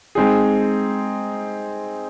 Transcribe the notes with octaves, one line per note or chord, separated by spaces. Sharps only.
G#3 C4 D#4 G#4